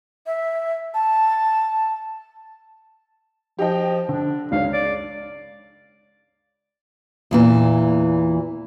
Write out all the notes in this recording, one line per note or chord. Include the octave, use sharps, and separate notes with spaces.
E5
A5
F3 G4 D#5 G5
D3 D4
C#2 D4 C#5 F5
D5
E2 A#2 E3